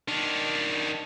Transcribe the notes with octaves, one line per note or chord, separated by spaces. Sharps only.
D#3 D4